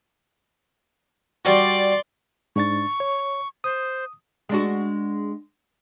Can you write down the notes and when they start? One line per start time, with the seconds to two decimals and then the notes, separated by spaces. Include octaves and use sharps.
1.45 G3 F#4 D5 C6
2.56 G#2 D4 C#6 A6
3.00 C#5
3.64 C5 D#6
4.49 G#3 D4 F#4